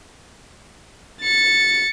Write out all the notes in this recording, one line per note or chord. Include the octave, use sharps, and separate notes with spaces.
A6 C#7